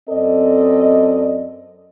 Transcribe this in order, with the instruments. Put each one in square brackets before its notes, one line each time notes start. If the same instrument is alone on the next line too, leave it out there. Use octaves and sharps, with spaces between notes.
[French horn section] F#2 C4 A4 D5 D#5